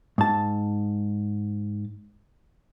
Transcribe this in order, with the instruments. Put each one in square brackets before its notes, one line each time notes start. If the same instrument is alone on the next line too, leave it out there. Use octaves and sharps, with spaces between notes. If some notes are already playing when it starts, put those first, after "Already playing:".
[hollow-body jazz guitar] G#2 A5